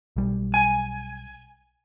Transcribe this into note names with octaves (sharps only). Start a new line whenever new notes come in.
B1 G3
G#5